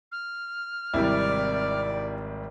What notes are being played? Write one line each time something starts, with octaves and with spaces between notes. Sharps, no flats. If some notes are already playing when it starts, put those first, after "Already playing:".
F6
G#1 C3 G3 E4 D5